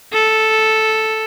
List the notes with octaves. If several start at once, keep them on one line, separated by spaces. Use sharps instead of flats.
A4